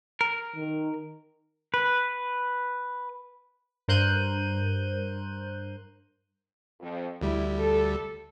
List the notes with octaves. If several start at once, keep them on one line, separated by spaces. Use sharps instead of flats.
A#4
D#3
B4
G2 A#4 C5 F#6 G6 D#7
F2
D2 G3 E4
A4